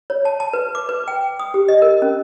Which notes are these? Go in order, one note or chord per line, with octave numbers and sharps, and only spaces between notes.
C#5
A5
A5
B4
D6
B4
G5
D#6
G4
D#5
A#4
C#4